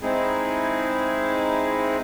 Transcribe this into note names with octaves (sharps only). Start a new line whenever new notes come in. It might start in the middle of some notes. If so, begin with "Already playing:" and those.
G#3 C4 D#4 E4 G#4